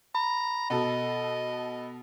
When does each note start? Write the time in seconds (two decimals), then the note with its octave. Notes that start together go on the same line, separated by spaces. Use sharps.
0.15 A#5 B5
0.70 B2 A4 D#5